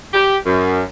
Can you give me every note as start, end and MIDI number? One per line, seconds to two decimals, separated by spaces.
0.14 0.36 67
0.46 0.83 42